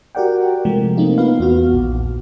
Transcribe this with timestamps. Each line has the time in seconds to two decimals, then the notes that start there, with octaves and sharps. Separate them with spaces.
0.15 F#4 G4 A#4 D5 F#5 G5
0.65 C3 F3 G#3 A3 A#4
0.97 A3 A#3 C4 D#4 F4
1.18 B3 F4 B4 F5
1.40 E2 B3 F#4 F6
1.73 A#1 D#2